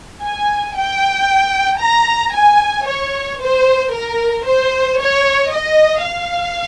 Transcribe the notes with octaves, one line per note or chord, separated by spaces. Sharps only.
G#5
G5
A#5
G#5
C#5
C5
A#4
C5
C#5
D#5
F5